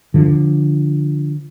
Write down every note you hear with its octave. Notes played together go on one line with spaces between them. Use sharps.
D3 F3